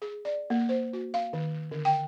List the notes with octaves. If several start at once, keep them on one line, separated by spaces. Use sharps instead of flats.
G#4
D5
A#3
C5
F#4
F5
D#3
D3
G5